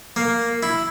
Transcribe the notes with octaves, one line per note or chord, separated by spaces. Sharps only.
A#3
E4